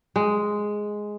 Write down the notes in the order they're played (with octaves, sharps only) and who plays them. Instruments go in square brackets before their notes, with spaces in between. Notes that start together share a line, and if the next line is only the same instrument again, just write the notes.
[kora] G#3